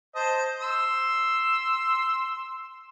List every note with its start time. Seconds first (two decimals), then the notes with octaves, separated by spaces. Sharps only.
0.16 C5 D#5 A5
0.61 C6 E6